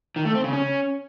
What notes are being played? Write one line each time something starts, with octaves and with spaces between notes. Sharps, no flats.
D#3
A3
C4
C#3
C#4